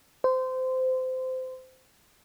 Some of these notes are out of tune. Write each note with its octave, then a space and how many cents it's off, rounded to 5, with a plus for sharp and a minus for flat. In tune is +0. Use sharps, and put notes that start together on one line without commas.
C5 -20